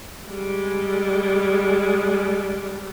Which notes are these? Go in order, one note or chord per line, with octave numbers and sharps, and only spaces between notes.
G3 G#3